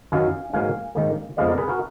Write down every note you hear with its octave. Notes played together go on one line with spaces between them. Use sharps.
F#2 D#3 F#3 F5 G#5
G#2 F#3 A#3 F5 G#5
G#2 D#3 A#3
F2 F3 G#3 B3 D5 F5
A#4 D5
G#4 B4
F#4 A#4